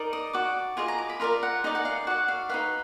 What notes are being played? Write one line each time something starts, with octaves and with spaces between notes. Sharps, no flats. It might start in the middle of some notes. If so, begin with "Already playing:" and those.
Already playing: D#4 A#4 D5
D#6
F#4 D5 D6
F4 G#4 D#5 G#5
A#5
D6
B5
F4 A#4 D5 A#5
F#5
D#4 G#4 D5 D#5
F#5
F5
F#4 D5 F#5
F5
D#4 F#4 B4 F5